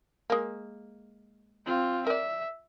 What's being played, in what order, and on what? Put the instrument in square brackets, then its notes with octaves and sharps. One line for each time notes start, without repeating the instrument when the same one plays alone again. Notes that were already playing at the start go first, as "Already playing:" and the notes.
[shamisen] G#3 A#3
[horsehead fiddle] C4 F4
[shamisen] A#4 D5 [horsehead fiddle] E5